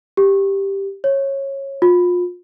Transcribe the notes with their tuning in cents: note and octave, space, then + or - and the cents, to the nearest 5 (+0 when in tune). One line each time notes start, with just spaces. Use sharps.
G4 +5
C#5 -20
F4 +30